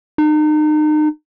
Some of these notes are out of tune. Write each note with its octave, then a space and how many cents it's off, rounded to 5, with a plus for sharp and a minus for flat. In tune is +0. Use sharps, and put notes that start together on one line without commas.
D#4 -35